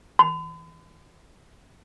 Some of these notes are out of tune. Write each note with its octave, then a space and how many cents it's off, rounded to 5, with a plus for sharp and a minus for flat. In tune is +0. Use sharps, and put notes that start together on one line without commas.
B5 +45